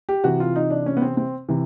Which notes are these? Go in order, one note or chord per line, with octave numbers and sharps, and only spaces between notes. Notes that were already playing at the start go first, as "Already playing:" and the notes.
G4
C3 E3 F#4
F4
D#4
D4
C#4
B3
C4
C4
C3 E3